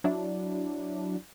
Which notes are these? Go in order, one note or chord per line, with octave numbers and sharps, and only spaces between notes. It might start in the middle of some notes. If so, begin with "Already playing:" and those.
F#3 D4 E4